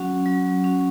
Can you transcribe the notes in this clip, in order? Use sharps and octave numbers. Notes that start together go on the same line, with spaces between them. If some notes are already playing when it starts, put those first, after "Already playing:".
Already playing: F#3 C#4 F#4
F#3
C#4 F#4